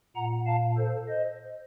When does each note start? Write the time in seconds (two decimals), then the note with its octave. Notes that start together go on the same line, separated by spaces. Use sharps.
0.16 A#2 F#5 A#5
0.47 F5 A5
0.78 A4 C5
1.08 C5 D#5